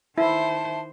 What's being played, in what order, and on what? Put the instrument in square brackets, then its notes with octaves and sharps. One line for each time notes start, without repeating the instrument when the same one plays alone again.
[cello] D#3 C5 [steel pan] E4 [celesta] E5 [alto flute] A5